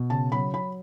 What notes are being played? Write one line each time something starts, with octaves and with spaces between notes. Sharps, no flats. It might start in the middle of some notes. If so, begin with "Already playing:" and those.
Already playing: B2
C#3 A5
F#3 B5
F#3 B5